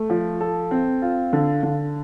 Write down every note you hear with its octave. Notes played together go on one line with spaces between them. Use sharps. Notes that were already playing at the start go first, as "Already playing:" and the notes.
Already playing: A3
F3
A4
C4
F4
D3
D3